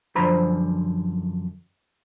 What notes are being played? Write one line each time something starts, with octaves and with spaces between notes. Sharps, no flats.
F#2 D3 F3 C5 A#5 B5